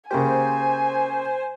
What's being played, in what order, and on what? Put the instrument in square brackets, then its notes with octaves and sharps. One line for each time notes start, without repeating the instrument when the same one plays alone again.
[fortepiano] C#3 A#3 G4 [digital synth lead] C5 [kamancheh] G#5